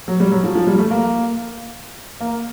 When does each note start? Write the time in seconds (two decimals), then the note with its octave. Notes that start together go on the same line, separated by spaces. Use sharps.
0.08 F#3
0.20 G3
0.32 F#3
0.44 F3
0.55 F3
0.67 G3
0.78 A3
0.91 A#3
2.21 A#3